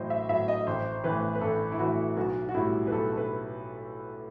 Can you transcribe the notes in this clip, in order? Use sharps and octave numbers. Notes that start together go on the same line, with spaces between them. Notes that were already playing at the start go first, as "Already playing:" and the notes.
Already playing: A1 A2 F#3 C5 D#5
E5
A2 F#3 E5
D#5
A1 C5
C5
A2 E3 B4
B4
A1 A4
E4
A2 E3 F#4
B1 F#4
F#4
A2 G3 E4
B4
B1 A4
A4
B4